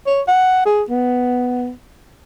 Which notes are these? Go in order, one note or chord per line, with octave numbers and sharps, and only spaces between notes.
C#5
F#5
G#4
B3